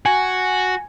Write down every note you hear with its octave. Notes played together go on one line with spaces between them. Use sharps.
F#4 G#5